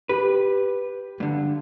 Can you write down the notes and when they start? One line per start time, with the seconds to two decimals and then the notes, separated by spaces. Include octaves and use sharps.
0.09 G4 B4
1.20 G2 D3